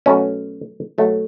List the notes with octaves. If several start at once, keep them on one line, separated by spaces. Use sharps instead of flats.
B2 F#3 A3 C#4
B2 F#3 A3